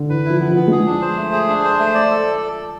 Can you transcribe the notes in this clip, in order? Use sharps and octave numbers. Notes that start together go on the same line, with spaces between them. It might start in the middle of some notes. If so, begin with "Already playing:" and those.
Already playing: D3
E3 B4
F3 E4
B3
F3
B3
G#3
F3 G#4
D4
C5
A3
G#4
D4
C5
A3
D5
A4